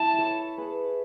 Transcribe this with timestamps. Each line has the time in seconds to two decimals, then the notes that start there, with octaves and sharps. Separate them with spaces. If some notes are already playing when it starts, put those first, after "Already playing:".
Already playing: E4 A5
0.18 A4 C#5
0.58 G#4 B4